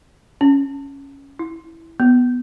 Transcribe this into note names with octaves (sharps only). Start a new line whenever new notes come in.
C#4
E4
B3